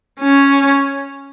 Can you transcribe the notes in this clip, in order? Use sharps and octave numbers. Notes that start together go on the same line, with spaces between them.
C#4